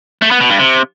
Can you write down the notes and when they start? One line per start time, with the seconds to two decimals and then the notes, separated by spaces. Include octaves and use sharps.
0.22 A3
0.31 B3
0.40 B2
0.50 G2
0.59 C3